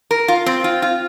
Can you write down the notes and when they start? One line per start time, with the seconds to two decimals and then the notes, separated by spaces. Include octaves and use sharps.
0.11 A#4
0.28 F4
0.46 C4
0.64 F4
0.82 F4